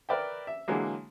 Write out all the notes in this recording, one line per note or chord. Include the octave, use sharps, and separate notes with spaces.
A#4 B4 D5 E5 G5
E5
D3 E3 F#3 G#3 A#3